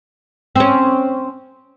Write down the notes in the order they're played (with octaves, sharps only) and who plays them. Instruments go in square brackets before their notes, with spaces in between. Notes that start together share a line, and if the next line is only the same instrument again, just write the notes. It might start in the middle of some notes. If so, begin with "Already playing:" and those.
[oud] C4 C#4